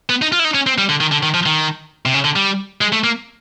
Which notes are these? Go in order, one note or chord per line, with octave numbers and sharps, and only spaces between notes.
B3
D#4
F4
E4
D#4
C#4
C4
G3
D3
D#3
D3
D#3
F3
D#3
C3
C#3
D3
G3
G#3
A3
A#3